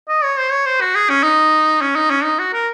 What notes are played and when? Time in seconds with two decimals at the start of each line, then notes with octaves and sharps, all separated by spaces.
0.09 D#5
0.24 C#5
0.38 C5
0.52 C#5
0.66 C5
0.81 F#4
0.96 G#4
1.10 C#4
1.23 D#4
1.82 C#4
1.96 D#4
2.10 C#4
2.24 D#4
2.39 F#4
2.54 A#4